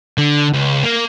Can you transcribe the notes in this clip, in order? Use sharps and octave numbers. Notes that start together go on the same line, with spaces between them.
D3
C#2
A#3